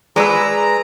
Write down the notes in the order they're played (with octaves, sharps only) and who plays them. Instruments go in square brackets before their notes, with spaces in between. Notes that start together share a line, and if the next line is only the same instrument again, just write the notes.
[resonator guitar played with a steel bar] G#3 B4 [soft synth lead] G#4 [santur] D5 B5 E6 [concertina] A#5